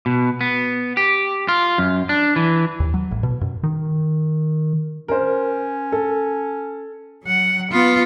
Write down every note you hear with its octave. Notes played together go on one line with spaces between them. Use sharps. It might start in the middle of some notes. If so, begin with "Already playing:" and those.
B2
B3
G4
F4
F#2
D4
E3
D#2
F#3
A1
B2
F#2
D#3
C#4 A#4 C5
A4
F#3 F#5
B3 F4